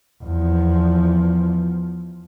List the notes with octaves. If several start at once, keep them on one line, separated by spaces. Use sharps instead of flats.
E2 F3